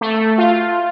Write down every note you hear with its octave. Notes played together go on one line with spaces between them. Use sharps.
A3
F4